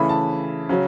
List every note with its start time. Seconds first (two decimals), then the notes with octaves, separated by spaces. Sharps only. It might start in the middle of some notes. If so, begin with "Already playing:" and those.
Already playing: C#3 E3 A3 E4 B5
0.09 A5
0.69 C#3 F#3 C#4